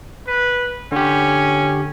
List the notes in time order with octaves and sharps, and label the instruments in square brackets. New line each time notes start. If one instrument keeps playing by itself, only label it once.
[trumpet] B4
[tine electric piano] D3 G4 [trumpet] C#4